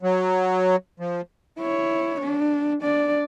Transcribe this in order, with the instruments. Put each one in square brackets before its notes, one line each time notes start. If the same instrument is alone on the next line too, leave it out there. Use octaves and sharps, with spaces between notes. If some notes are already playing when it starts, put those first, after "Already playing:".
[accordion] F#3
F3
[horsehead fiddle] E4 C#5
D4
D4 D5